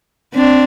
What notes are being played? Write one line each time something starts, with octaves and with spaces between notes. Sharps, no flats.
C4 D4